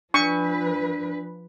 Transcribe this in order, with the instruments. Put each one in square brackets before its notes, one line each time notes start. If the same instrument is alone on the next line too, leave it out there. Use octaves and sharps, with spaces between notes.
[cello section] F3 B4 [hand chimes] D4 [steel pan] C#6